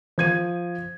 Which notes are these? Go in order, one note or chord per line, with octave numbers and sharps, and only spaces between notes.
F3 G#6 D#7